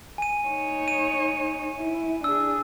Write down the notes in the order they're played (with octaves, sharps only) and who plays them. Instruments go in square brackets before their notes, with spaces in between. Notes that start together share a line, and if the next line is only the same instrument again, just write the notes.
[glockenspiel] G#5 D#7
[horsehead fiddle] D#4 C#5
[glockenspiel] D#7
[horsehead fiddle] E4
[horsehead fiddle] D4 G#4 [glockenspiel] E6